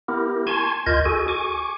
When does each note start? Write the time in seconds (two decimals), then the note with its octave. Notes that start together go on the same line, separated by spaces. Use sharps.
0.08 B3 E4 G4 A#4
0.47 G#5 A5 C6 C#6 G#6
0.86 D2 F4 A#4 D#5 G6 G#6
1.05 F#4 G#4 A4 G#5
1.28 G#5 C#6 D6